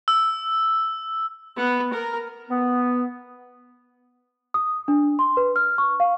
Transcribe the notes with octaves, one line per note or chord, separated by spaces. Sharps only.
E6
B3
A#4
B3
D#6
D4
C6
B4
F6
C#6
F5